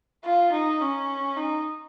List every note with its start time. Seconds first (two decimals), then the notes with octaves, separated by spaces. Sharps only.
0.25 F4
0.52 D#4
0.81 C#4
1.36 D#4